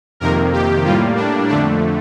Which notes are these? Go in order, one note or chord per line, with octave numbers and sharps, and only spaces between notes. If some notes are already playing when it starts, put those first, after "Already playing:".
F2 C3 D#3 A#3 A#4
G4
A2 G3 A#3 F4
D4
F2 D3 A3 D4